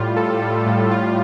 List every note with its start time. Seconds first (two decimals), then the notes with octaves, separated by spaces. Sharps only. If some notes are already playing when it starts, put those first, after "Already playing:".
Already playing: A2 G3 F4
0.17 A4
0.42 G3
0.66 A2
0.91 F4